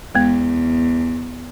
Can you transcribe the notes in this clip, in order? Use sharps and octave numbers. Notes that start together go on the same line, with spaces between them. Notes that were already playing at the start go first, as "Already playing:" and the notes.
E2 G#3 B3